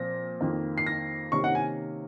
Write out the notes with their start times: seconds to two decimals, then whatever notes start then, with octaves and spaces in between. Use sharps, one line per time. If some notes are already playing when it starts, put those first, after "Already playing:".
Already playing: A#2 F3 C4 A#6
0.41 F2 D#3 A#3
0.78 C7
0.86 A#6
1.32 C3 D#3 A#3 C#4 C#6
1.44 F#5
1.55 G#5